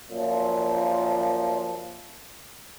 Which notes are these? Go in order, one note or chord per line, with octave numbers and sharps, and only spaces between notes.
F#2 A#2 F3